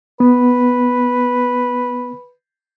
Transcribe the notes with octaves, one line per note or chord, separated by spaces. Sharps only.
B3 B4